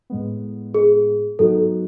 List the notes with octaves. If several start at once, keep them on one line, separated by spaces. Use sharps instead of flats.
A2 G#3 B3
G#4
G#2 F#3 B3 D#4 F#4 A4